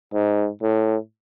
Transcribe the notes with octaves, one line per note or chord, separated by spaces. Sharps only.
G#2
A2